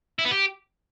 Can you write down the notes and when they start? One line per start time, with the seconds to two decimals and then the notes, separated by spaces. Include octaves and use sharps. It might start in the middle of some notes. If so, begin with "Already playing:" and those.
0.19 E4
0.25 B3
0.31 G4